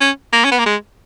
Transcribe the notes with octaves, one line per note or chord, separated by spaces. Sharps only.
C#4
A#3
C#4
B3
A#3
G#3